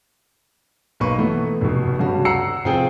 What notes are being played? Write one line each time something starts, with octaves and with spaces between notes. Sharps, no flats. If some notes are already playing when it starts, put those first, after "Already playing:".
B1 A#3 B4 C#6
E3 A3 B3
F1 B2
G2 C#3 F#4
F#5 A#5 E6 C7 C#7
F1 C4 F4 G#4 G5